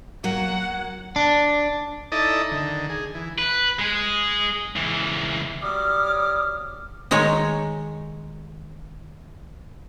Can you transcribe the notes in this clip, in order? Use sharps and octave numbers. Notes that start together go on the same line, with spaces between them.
F#3 A#3 F#5
D4
D#4 E4 A4 D5 D#5
D3 D#3
G#4
E3
B4
G#3 G#4
C#2 E3
F#3 G3 C#5 D6 D#6 F6
D#3 G#3 D#4 C#5